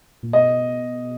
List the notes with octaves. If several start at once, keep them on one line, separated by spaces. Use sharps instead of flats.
A#2
B2 D#5